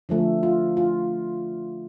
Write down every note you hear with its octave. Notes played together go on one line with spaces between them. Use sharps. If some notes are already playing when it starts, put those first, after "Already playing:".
D3 F3 A3
F4
F4